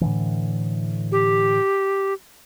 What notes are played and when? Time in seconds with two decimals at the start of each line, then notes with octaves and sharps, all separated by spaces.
0.01 A2 D3 E3
1.12 G4